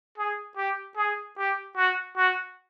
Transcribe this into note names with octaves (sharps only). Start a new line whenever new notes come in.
G#4
G4
G#4
G4
F#4
F#4